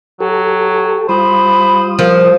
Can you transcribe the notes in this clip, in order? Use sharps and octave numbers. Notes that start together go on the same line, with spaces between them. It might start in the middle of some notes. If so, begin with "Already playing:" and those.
F#3 G4 A4
G3 F4 C5 B5 D#6
F3 A#4